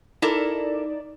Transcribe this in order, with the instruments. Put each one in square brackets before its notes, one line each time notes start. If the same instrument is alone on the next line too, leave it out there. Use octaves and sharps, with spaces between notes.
[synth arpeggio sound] D#4 D5 [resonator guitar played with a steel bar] E4 A4 A#4